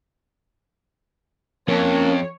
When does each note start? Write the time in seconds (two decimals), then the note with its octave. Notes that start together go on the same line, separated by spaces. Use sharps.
1.68 F2 A#3 C#4 C#5 A5